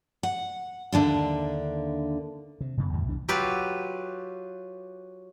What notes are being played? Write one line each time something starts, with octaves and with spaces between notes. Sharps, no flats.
F#5
D#2 D3 D4 E5
C3
F1 F#2 C#3 B3
E2 A2 D#3 G3
C2 B2 E3 D4
F#3 F4 G4 B4